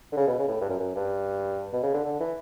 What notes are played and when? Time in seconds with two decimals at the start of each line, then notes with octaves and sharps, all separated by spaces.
0.12 D3
0.17 C#3
0.27 B2
0.39 C#3
0.48 A2
0.61 G2
0.69 F#2
0.80 F#2
0.96 G2
1.73 B2
1.83 C#3
1.94 D3
2.04 D3
2.20 E3